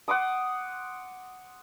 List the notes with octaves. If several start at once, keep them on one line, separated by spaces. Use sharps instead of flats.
F#5 C6 D6 D#6